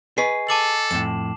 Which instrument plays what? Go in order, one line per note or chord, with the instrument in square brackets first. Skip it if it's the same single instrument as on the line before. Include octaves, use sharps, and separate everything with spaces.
[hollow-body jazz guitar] G#4 B4 [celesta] D#5 G#5 C#6 [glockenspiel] C7
[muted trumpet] A4 [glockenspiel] A5 D6 F#7
[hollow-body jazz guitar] F2 A2 [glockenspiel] E7